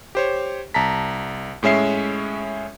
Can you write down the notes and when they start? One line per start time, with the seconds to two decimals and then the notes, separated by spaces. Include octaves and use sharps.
0.15 G4 C5 C#5
0.74 C2 A5 A#5 B6
1.63 A2 G#3 C#4 E5 C7